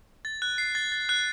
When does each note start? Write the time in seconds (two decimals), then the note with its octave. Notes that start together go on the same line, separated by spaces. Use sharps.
0.25 A6
0.42 F#6
0.58 C7
0.75 A6
0.92 A6
1.09 F#6